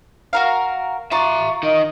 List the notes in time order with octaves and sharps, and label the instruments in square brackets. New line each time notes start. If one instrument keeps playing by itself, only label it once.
[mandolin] F#4 A#4 F5
[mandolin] F4 D5 [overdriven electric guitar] E5 A#5 [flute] C#6
[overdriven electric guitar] D#4 A#4 [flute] D#5